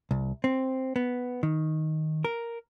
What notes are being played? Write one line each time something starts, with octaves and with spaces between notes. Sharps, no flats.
C2
C4
B3
D#3
A#4